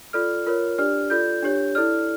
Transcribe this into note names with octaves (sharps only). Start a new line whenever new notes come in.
F4 A4 D5 F6
F4 A#4 C#5
D4 G4 D5 F6
F4 A4 D5 G6
D4 G4 C#5
E4 A4 D5 F6